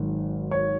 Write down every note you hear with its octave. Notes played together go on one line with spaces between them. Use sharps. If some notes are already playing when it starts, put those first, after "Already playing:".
Already playing: G#1 G#2 F#3
C#5